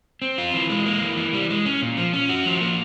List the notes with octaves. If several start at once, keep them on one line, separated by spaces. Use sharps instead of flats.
C4
F4
E3
G#3
A#3
E3
E3
G3
G#3
C#4
A#2
F3
C#4
F#4
F3
A#3